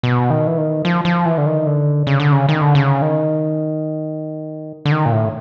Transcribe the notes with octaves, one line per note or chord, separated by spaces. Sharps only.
B2
D#3
E3
D#3
F3
F3
E3
D3
D#3
D3
C#3
D3
C#3
D#3
D3
C#3
D#3
D3
D#3
A#2
A2